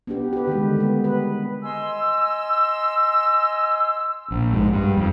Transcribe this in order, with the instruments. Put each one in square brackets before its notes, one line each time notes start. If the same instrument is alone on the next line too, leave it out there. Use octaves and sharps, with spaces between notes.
[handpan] B3 D4 G4
G4 B4
D3 D#3 G3 G#3
G#3 B3
B4
[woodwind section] D#5 G#5 C6 E6
[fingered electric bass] A#1
G#2
G2
F2